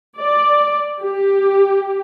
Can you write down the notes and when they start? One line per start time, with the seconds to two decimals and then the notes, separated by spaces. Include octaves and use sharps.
0.20 D5
1.03 G4